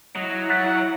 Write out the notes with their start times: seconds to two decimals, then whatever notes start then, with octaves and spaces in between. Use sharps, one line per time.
0.16 F#3 E4 D#5
0.50 F#5 F#6 A6 B6